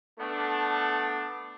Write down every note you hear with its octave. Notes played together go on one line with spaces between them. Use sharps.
A3 B3 D4